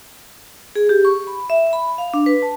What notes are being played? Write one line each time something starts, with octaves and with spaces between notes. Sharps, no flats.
G#4
G4
C#6
B5
E5
B5
F5
D4
B4
A5